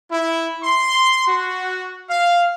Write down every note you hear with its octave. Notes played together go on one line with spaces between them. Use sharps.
E4
C6
F#4
F5